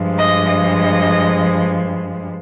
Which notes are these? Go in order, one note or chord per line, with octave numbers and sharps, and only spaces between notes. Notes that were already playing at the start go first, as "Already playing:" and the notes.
Already playing: G2 F3 G#3
D#5
D#5